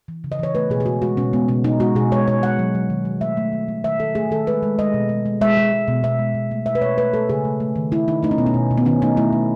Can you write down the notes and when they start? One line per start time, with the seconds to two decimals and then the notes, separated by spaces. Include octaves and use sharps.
0.08 E3
0.24 C#3
0.32 D#5
0.39 E3 C#5
0.55 A3 B4
0.70 B2 G#4
0.80 G#4
0.86 G#3 F#4
1.02 G#3 F#4
1.17 B2 C#4
1.33 G#3 B3
1.48 B2 C#4
1.64 B2 D#4
1.80 G#3 F#4
1.95 B2 G#4
2.12 G#3 C#5
2.28 B2 C#5
2.43 G#3 F#5
2.59 F#3
2.75 F#3
2.90 D#3
3.05 F#3
3.21 A3 E5
3.37 A3
3.53 D#3
3.68 A3
3.84 D#3 E5
3.99 D#3 A4
4.15 A3 G#4
4.31 D#3 A4
4.47 G#3 B4
4.63 G#3
4.79 G#3 D#5
4.94 B2
5.09 G#3
5.26 G#3
5.41 G#3 E5
5.57 G#3
5.72 G#3
5.88 B2
6.03 B2 E5
6.19 G#3
6.34 B2
6.51 A3
6.66 B2 E5
6.75 B4
6.82 B2 C#5
6.98 A3 B4
7.13 A3 A4
7.29 C#3 G#4
7.45 A3
7.60 A3
7.76 D#3
7.92 A3 E4
8.08 D#3 D#4
8.23 A3 D#4
8.31 C#4
8.38 B2 B3
8.46 C#4
8.54 B2
8.71 B2
8.78 B3
8.85 D#3 C#4
9.02 A3 D#4
9.17 A3 E4
9.33 A3